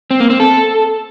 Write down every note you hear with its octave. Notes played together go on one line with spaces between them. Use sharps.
C4
A#3
C4
A4